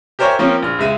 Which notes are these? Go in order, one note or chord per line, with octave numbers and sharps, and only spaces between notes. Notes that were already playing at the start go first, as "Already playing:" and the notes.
G4 A#4 C5 C#5 E5 G#5
F3 A#3 C4 C#4
A#1 F6
C#2 G#3 E5 D#7